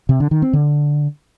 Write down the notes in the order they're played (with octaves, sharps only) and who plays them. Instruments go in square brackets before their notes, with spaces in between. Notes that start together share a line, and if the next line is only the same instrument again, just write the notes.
[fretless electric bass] C3
D3
D#3
C4
D3